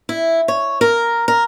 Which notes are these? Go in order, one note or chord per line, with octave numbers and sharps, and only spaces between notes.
E4
C#5
A#4
A#4